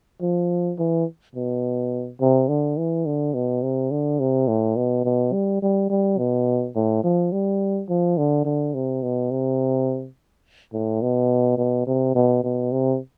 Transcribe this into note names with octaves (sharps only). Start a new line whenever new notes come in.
F3
E3
B2
C3
D3
E3
D3
B2
C3
D3
C3
A2
B2
B2
G3
G3
G3
B2
A2
F3
G3
F3
D3
D3
C3
B2
C3
A2
B2
B2
C3
B2
B2
C3